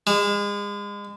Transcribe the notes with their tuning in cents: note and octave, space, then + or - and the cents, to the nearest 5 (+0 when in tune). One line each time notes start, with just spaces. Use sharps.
G#3 -35